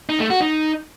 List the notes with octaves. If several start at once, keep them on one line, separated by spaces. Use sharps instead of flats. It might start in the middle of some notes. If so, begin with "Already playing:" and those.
D#4
A3
F#4
D#4